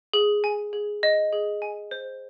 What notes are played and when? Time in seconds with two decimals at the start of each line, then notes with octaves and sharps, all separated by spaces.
0.13 G#4
0.44 G#5
0.73 G#4
1.03 D#5
1.32 G#4
1.62 G#5
1.91 C5